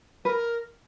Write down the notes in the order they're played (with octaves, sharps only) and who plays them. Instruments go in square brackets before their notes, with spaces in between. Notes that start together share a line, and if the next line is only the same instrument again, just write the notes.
[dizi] A#4 [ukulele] B4